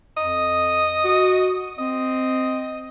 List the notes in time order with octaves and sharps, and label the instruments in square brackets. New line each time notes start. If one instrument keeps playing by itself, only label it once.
[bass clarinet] F2 [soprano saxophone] D#5
[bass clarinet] F#4
[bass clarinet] C4 [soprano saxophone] D#5